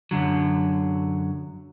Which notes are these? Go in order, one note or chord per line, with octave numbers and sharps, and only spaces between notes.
F#2 D3 F#3